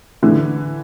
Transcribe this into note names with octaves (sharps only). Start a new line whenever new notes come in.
A2 D3 E3